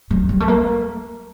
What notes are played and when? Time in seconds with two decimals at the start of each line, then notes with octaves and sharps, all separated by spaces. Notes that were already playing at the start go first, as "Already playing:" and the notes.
0.11 F#3
0.29 G3
0.40 A3
0.48 A#3